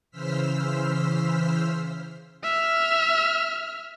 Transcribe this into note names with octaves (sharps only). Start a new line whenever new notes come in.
C#3 E3 C5 E6 F6 B6
E5 F6